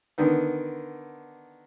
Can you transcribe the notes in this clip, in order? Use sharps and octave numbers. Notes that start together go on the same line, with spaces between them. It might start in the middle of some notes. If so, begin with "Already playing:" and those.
D3 D#3 B3